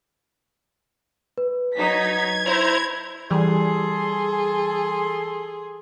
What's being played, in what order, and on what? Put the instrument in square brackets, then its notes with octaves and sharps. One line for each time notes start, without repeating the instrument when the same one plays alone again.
[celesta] B4
[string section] F#3 D#4 B6 [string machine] G#6
[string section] E4 [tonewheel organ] C5 A#5
[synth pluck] E3 [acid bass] G3 [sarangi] G#4 [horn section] A4 C6